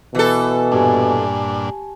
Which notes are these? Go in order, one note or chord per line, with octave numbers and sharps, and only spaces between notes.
B2 E3 A4
G2 A#2 D4 G4 G#5 A5